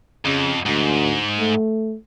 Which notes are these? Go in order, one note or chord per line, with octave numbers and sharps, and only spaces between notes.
F2 C#3
D2 G#2
A3